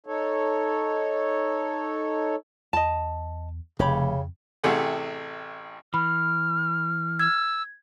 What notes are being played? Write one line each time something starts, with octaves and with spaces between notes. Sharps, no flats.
D#4 A4 C#5
E2 D#5 A5
F1 F2 C#3 G4 C#5 B5
A1 C3 A3 G4 G#4 F#5
E3 B5 F6
E6 G#6